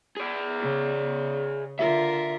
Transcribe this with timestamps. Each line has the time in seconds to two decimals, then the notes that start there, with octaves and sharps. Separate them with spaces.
0.17 G#4 D5
0.61 C#3
1.79 D3 F4 A#4 E5